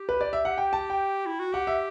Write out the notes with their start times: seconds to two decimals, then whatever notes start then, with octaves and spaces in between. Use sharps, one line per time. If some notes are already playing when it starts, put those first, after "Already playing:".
Already playing: G4
0.09 B4
0.21 D5
0.33 E5
0.45 F#5
0.58 G5
0.73 A5
0.90 G5
1.26 E4
1.40 F#4
1.53 G4 F#5
1.67 E5